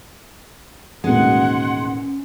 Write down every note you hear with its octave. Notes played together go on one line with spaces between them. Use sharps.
A1 D#2 B2 G#3 C#4 F#5 C6